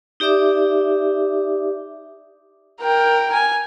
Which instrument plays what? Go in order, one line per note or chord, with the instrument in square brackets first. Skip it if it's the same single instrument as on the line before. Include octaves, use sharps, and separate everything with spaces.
[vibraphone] D#4 G4 D5 E5 D6
[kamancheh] A#4 G5
G#5